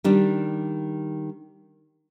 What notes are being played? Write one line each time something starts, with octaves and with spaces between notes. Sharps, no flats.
D#3 G3 D4